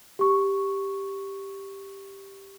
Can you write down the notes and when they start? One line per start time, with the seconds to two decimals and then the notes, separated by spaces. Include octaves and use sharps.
0.19 G4 C#6